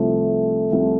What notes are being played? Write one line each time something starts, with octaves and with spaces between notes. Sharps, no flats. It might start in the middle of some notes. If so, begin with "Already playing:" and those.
Already playing: C2 C3 F3 A3
C2 C3 F3